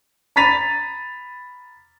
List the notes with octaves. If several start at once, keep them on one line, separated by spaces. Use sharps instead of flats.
A#5 B5 A6 B6 D#7 F7